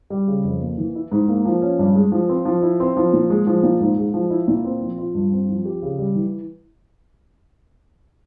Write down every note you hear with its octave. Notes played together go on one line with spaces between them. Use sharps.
G3
C#3
F2
A#3
E3
E4
G#2
A#3
F3
C#4
G2
G#3
F3
C4
F3
E4
C4
F3
A#2
G#3
F3
A#2
G#2
G#3
F3
E4
A#2
C4
F3
F4
G2
C4
F3
G4
C#3
G3
E3